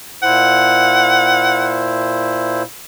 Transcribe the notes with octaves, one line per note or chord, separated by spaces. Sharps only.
A#2 E4 C5 F#5